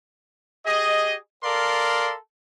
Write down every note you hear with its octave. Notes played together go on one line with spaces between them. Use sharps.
G4 G#4 D#5
A4 A#4 D5 F5 C6